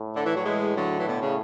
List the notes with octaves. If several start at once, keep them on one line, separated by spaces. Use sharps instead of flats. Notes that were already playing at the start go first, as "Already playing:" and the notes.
Already playing: A2
D3
E3
F#3
E3 G#3
D3 F#3
E3
B2 D3
C#3